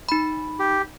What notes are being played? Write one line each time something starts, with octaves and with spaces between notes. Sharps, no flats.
D#4 B5
G4